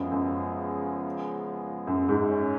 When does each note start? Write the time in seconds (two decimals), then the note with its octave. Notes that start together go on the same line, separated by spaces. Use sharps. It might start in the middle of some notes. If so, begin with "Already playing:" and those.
Already playing: F#2 C#3 F3 G#3 B3
0.11 F#2
1.87 F#2
2.09 G#2
2.29 C#4